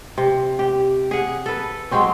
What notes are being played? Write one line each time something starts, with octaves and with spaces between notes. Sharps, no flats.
C3
G4
G#4 F#5
A4 B4
F#3 G#3 C4 C#4